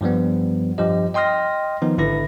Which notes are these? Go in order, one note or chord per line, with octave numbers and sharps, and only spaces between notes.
G2 F3 G3 B3
G2 F3 G4 D#5
D#5 G5 C6 D#6 F6 A#6
D#3 F3 B3 D#4
G#1 D3 E4 B4 A#6